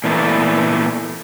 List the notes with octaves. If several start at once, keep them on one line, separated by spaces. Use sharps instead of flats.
A#2 E3 A3 B3